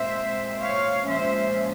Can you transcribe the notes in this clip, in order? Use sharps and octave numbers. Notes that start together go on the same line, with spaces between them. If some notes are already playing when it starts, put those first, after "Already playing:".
Already playing: A#2 G#3 C4 C5 E5
C#5 F5
A#2 F3 G#3 C#4 C5 E5